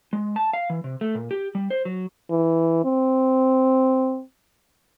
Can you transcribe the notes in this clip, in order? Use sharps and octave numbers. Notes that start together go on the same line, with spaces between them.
G#3
A5
F5
E3
C3
A3
A#2
G4
G3
C5
F#3
E3
C4